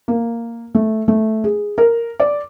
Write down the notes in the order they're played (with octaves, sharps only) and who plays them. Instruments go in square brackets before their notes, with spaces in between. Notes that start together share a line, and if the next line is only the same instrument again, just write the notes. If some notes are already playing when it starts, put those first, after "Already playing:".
[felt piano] A#3
A3
A3
G#4
A#4
D5